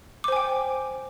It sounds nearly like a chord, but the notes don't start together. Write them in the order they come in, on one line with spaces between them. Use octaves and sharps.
D6 C5 G#5 G5